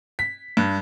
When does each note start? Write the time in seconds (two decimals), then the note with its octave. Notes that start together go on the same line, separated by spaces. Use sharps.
0.19 B6
0.57 G2